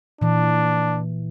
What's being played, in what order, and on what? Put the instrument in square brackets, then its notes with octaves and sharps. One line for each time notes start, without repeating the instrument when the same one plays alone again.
[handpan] A#2 E3 [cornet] D4